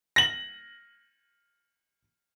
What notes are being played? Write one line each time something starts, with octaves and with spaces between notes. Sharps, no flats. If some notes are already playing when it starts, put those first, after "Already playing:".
A#6 F#7